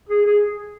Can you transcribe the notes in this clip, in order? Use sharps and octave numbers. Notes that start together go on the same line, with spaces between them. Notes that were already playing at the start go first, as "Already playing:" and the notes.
G#4
G#4